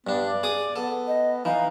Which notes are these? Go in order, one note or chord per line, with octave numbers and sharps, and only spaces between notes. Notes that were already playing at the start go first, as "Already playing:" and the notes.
G2 B3 D4
D5
G#4 D6 D#6
B3 A4
D#5
E3 D#4 F5